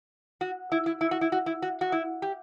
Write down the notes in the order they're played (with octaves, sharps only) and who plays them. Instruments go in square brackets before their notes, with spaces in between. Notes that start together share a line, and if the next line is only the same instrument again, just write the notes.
[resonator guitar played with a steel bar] F#4
E4
E4
E4
F#4
E4
F#4
E4
F#4
F#4
E4
G4